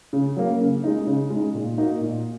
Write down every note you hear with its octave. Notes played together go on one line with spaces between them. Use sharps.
C#3
F#3 A#3
C#3
G#3 D#4
C#3
G#3 D#4
A#2
A#3 D#4 F#4
A#2